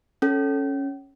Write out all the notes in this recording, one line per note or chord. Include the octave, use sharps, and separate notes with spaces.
C#4 A4